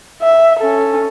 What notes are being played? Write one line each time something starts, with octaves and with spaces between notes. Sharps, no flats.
E5
C#4 A4